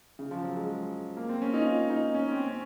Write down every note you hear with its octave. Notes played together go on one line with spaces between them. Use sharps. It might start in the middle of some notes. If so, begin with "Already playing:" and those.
C#3
F3
F#3
G#3
A#3
C4
C#4
D#4
F4
D#4
C#4
C4
C#4